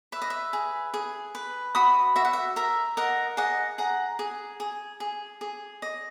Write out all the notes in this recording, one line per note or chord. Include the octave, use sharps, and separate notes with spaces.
B4 E5
D#5
E5
G#4
G#4
B4
F#4 B5 D#6
F#4 E5
F#5
E5
A#4 E5
A#4 D#5 F#5
G#4 D#5 F#5
G#4 F#5 A#5
G#4
G#4
G#4
G#4
D#5